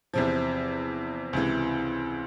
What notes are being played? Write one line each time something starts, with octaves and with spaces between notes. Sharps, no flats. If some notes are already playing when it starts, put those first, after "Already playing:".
E2 C3 F3
C#2 C3 E3